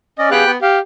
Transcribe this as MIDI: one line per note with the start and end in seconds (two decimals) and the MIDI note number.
0.19 0.30 61
0.19 0.30 74
0.19 0.28 75
0.31 0.44 59
0.31 0.51 67
0.31 0.44 68
0.31 0.44 77
0.31 0.51 79
0.31 0.51 90
0.46 0.57 59
0.62 0.79 67
0.62 0.79 77